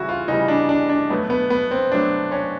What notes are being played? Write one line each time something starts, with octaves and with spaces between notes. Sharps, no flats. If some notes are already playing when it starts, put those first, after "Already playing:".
Already playing: C#3 E3 G3 E4 F#4
F4
C#3 E3 G3 D#4
D4
D4
D4
B2 F#3 A3 B3
B3
B3
C4
B2 F#3 A3 D4
C#4